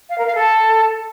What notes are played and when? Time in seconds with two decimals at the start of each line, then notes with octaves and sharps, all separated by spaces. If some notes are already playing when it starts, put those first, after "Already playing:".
0.09 F5
0.18 A#4
0.26 F5
0.35 A4